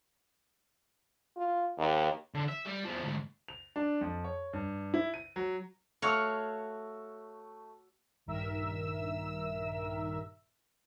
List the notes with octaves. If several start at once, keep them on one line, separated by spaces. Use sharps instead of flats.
F4
D#2
D3
E5
G3
E2 F3
D2 G#2
F7
D4
F2
C#5
G2
E4
D#7
F#3
A3 F#4 C#5 F5 C#6 E6
A#1 G2 D#3 A#4 E5 E6